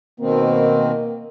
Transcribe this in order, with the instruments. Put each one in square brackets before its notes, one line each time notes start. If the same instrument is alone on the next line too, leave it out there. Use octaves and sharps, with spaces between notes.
[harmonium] B2 D#3 C4 [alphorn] A#3